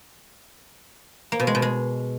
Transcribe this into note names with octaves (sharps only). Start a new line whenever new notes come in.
A#3
B2
G#3
B2
G#3